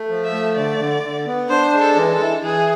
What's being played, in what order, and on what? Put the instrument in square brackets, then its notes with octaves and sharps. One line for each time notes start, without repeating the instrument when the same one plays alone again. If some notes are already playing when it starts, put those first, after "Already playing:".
Already playing: [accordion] A3
F3
[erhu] E5
[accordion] A3
[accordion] D3 [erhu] D5
[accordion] D3
D3
B3
[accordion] D4 [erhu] C5
[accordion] G#3
[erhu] A4
[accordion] E3
[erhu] A4
[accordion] E3
[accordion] E3 [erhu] G#4